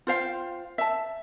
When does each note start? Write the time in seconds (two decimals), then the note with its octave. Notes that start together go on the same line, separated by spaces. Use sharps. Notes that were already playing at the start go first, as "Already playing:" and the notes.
0.07 F4 C5 F5 G5
0.78 E5 A5